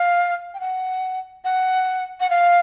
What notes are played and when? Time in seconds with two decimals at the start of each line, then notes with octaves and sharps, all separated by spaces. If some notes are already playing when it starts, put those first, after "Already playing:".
Already playing: F5
0.54 G5
0.60 F#5
1.45 F#5
2.20 F#5
2.30 F5